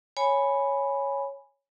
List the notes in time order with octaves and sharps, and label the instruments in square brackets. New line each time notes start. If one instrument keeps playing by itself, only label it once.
[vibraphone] C#5 G#5 B5